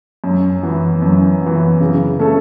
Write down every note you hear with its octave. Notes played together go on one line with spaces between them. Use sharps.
F#2
E3 B3
F#2
E3 B3
C#3
A3 C#4 A4